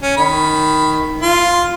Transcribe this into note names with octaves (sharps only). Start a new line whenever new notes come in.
C#4
D#3 B5
F4